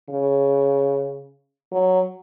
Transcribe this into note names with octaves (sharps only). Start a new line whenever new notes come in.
C#3
F#3